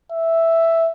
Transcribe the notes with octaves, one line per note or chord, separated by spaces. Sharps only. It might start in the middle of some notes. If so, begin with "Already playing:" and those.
E5